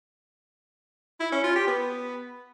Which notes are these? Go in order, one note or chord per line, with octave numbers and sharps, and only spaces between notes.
E4
C#4
F4
G4
B3